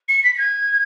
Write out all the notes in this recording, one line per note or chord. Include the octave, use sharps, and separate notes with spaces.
C#7
B6
B6
G#6